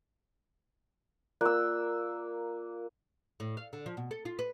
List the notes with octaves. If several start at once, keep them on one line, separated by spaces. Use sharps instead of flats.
A#3 F4 D5 E6 F#6
A2
F5
D3
F3
B2
A4
F4
B4